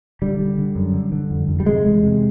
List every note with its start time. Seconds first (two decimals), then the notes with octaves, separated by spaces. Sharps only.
0.22 D3 G3
0.39 D3
0.58 D3
0.76 F#2
0.94 D3
1.12 D3
1.31 F2
1.48 F2
1.60 G3
1.66 C3 G#3
1.86 E2
2.03 C3